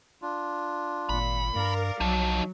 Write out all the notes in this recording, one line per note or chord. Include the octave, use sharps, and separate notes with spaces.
D4 F4
G#1 A#2 B5
G2 A#4 D5 F5
B1 F3 F#3 D#4